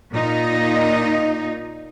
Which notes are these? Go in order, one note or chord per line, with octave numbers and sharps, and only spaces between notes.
A#2 D#4